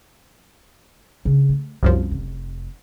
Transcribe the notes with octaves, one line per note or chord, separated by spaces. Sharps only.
C#3 D4
A3
C2 F#2 F3 G3 D4
F1